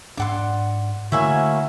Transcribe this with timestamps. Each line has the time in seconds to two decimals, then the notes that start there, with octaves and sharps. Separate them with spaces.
0.17 G#2 D4 D5 F#5 C6
1.12 D3 A3 A#3 C#4 E4 F#4 E5 G#5